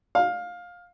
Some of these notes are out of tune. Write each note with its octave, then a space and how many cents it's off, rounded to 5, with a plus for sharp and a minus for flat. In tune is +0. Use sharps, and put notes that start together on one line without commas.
F5 +15